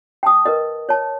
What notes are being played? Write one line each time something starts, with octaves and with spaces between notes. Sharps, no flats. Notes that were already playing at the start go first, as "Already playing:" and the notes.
G5 A5 D#6
A#4 B4 D#5
C#5 A5